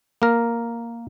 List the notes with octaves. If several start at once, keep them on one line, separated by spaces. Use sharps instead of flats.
A#3 A#4